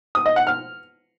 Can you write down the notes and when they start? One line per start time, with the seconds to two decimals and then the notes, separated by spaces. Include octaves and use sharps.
0.15 D#6
0.26 D#5
0.36 F#5
0.47 F6